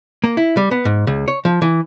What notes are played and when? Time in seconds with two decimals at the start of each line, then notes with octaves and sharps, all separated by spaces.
0.24 A#3
0.37 E4
0.57 G3
0.71 B3
0.85 G#2
1.07 C#2
1.28 C#5
1.45 F3
1.62 E3